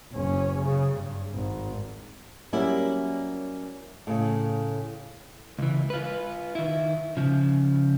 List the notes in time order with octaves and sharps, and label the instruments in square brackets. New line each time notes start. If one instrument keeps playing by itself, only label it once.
[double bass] F#1 C#4
C#3
G2
G#1
[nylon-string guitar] F#3 G3 A#3 C#4 E4
A2 C#3
[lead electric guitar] C#2 E3
F4 B4
D#3 E4
C#3 F3